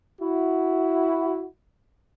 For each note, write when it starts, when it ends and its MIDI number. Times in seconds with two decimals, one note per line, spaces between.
0.21 1.45 64
0.21 1.45 66